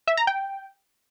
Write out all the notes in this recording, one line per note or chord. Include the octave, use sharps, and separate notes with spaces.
E5
A#5
G5